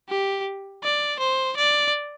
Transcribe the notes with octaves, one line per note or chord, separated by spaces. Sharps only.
G4
D5
C5
D5